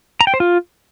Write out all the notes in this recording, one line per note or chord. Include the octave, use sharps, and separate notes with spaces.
A#5
G5
C5
F4